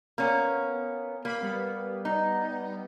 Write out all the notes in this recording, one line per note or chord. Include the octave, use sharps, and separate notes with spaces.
A#3 B3 C#4
A#3 B5
G3 B3
D#4